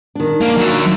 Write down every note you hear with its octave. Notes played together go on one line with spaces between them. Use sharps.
D#3 D4
A#3
F#3 E5